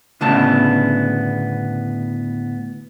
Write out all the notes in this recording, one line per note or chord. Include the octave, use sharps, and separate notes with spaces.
D2 A2 C#3 B3 A5